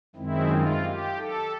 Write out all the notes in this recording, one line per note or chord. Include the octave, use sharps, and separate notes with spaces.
F#2 D#3 G#3 C4 E4
F4
G4
A4